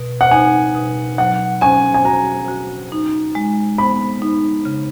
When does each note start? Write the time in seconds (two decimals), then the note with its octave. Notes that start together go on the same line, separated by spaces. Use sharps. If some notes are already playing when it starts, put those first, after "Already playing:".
Already playing: B2
0.21 F#5
0.31 D#4 G#5
0.75 B2
1.18 F#3 F#5
1.61 C#4 G#5
1.94 G#5
2.05 F#4 A#5
2.48 F#4
2.92 D#4
3.35 G#3
3.78 B3 B5
4.22 D#4
4.65 C#3